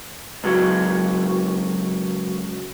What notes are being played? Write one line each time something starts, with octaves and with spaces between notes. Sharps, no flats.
C#2 F#3